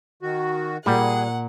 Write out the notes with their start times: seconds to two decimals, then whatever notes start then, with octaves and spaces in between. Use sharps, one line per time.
0.22 D#3 F#4
0.86 A#2 G3 G#4 F#5